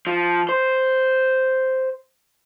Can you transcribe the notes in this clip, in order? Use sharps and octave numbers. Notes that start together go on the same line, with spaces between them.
F3
C5